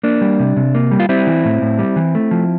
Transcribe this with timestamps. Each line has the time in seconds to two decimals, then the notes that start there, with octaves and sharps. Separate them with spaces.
0.04 A#3 D4
0.21 G3
0.40 C3
0.56 C3
0.75 A#3
0.91 G3
1.00 F4
1.09 G3 C4 E4
1.27 E3
1.45 A2
1.62 A2
1.79 G3
1.96 E3
2.15 A3
2.31 F3